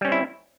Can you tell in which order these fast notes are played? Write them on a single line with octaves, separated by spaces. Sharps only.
G3 C#4 C4 E4